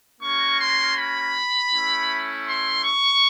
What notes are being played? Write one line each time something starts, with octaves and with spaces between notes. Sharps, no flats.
A#3 C#4 F#4 C#6
C6
B5
A3 C#4 E4
C6
C#6